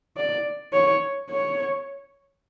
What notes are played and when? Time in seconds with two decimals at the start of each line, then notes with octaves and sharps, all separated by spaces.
0.17 D5
0.73 C#5
1.30 C#5